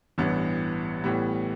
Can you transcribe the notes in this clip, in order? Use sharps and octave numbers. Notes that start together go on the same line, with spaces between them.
A1 G2 E3 B3
A2 E3 G3 B3